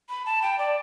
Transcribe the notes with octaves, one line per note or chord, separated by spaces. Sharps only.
B5
A5
G5
D5